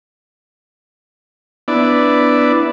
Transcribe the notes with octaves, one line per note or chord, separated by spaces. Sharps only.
B3 D4 E4 D5